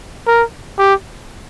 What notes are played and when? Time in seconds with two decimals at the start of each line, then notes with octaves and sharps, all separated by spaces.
0.27 A#4
0.78 G4